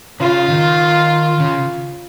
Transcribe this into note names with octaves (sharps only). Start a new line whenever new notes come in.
C#3 F4
D#3
C#3